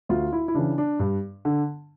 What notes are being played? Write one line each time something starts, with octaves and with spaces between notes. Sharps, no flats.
D2 F4
E4
E4
C#3 E3 D4
D4
G2
D3